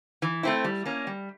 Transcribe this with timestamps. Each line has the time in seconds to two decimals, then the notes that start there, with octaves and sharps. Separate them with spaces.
0.22 E3
0.43 A3 C4 E4
0.64 G3
0.85 A#3 C#4
1.07 G3